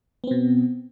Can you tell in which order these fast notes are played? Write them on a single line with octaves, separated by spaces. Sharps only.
B3 C4 B2